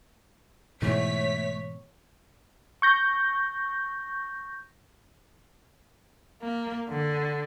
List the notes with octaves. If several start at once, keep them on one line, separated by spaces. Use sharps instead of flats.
G#2 B2 E3 A3 C#5 B6
C#6 G6 A#6
A#3
D3